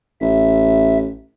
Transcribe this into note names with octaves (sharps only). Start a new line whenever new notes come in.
A1 E5